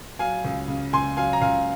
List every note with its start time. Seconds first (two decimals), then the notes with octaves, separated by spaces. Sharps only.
0.19 F#3 F5 G#5
0.45 C#2
0.68 C#3
0.93 C#2 G#5 C6
1.17 F#3 F5 G#5
1.33 A#5
1.41 C#2 F5 G#5